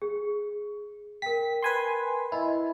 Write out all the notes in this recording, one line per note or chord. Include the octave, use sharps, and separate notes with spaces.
G#4
A#4 G5 B6
B4 G#5 C6
E4 D#5 B5